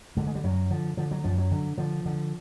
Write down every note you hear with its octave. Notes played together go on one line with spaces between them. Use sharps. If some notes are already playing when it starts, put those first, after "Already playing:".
D3 G#3
G#3
G3
F#2 F#3
D3 F3
D3 F3
F#3
F#2 F3
F#3
D3
D3 F3
D3